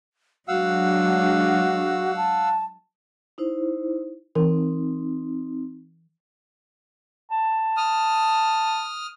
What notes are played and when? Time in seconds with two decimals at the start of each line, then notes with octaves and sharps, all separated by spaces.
0.48 F#3 G#3 D4 F#4 F5 F#5 E6
2.17 A5
3.38 D#4 E4 C5
4.35 E3 C4 D#4 A#4
7.31 A5
7.77 D#6 F6